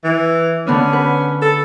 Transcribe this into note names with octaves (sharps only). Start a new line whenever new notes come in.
E3
D3 B3 C#4 D4
B4
A4